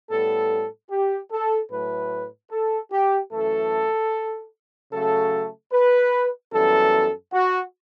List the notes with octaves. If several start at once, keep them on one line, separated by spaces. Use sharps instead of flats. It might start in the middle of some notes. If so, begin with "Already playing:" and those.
A2 G3 B3 A4
G4
A4
A2 F#3 A3 B4
A4
G4
F#2 E3 A3 A4
C#3 F#3 A3 A4
B4
F#2 E3 G3 B3 A4
F#4